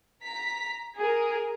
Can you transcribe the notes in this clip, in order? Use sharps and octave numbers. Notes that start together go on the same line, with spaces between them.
A#5 B6
G#4 A#4